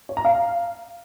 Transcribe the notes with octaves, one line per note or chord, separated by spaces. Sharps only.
C#5
A#5
F5